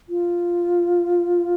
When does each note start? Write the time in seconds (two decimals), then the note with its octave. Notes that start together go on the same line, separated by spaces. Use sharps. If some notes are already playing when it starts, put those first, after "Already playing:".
0.09 F4